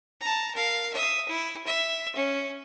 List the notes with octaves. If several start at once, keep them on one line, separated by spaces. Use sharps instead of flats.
A5 A#5
A#4 F5
E5 D#6
E4
E5
C#4